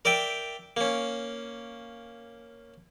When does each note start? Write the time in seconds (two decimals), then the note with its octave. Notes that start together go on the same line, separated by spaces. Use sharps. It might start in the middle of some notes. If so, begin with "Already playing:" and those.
0.05 A#4 D5 E5 G5
0.77 A#3 C#4